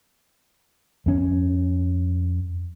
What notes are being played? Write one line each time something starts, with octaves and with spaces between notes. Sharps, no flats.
F2 C#4